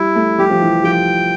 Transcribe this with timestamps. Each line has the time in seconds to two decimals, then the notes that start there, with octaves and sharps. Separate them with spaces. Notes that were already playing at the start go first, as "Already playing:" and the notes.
Already playing: G3 E4
0.15 A3
0.38 G3 G4
0.50 F3
0.61 E3
0.84 F3 G5